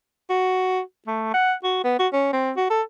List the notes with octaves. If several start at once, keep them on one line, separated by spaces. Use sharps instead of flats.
F#4
A3
F#5
F#4
B3
F#4
C#4
C4
F#4
A4